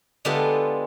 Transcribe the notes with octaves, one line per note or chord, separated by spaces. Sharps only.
D3 G#3 B3 F4 G4 A4